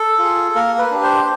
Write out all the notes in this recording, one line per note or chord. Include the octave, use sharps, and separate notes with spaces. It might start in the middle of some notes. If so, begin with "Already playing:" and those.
Already playing: A4
F4 G#4
A#3 A#4
B4
D4 G4
C5